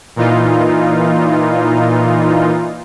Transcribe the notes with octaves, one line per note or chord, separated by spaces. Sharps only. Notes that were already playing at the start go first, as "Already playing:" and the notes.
A#2 E3 D#4 F4